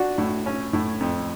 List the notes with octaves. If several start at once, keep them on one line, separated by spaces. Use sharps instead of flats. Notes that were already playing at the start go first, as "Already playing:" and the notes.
Already playing: D4 F#4
A2
C#4
A2
F2